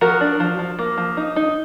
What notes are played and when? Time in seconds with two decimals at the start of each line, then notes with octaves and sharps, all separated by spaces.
0.01 F3 F#4 A#4
0.21 D4
0.40 F3
0.59 F3
0.79 A#3
0.98 F3
1.17 D#4
1.36 D#4